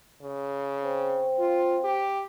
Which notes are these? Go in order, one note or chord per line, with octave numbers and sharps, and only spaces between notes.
C#3
C4
F4
G4